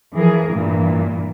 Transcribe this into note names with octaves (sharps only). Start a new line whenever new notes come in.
E3 F3 G#4 A#4
G2 A#2 E3